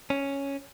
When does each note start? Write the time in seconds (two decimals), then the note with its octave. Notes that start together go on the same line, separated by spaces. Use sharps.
0.10 C#4